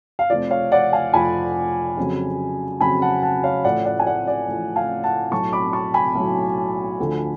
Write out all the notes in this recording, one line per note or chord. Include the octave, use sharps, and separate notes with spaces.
F5
F1 F2 F3 D5
C#5 F5
D5 F#5
F5 G#5
F1 F2 F3 G#5 B5
F2 C#3 F#3
F2 C#3 F#3 G#5 B5
F#5 A5
F#5 A5
C#5 F5
A1 A2 F3 D5 F#5
D5 F#5
G#5
D5 F#5
D5
A1 A2 F3
F5 G#5
F#5 A5
B1 A2 F#3 A5 C#6
B5 D6
A5 C#6
G#5 B5
B1 A2 F#3
D2 D3 F3